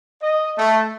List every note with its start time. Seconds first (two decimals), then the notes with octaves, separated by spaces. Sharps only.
0.22 D#5
0.56 A3